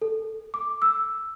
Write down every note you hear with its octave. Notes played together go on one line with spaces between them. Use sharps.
A4
D6
E6